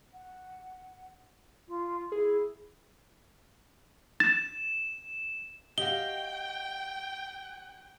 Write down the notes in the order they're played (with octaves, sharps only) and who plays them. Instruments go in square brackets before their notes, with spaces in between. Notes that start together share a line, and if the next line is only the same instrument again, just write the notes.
[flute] F#5
F4
[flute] E4 [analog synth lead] G#4
[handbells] A6 [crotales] E7
[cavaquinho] F#4 D#5 [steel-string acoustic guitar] G4 C#5 F5 [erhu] G5 [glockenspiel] G7